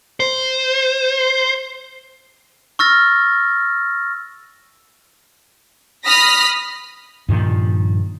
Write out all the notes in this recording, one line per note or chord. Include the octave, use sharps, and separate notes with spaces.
C5
C#6 E6 F6 A6 A#6
B5 D#6 F6 A#6 B6
G2 A#2 D#3 F3